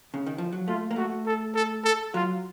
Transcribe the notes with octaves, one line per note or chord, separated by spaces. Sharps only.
C#3
D#3
F3
F#3
A3 F4
A#3
A3 F#4
A4
A4
A4
F#3 F4